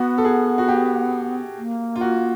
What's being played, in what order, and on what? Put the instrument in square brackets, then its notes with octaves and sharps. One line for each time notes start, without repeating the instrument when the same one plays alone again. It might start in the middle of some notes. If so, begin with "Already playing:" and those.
Already playing: [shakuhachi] B3 [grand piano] F#4
[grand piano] A4
G#4
F#4
G4
[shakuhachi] A#3
[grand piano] F4
F#4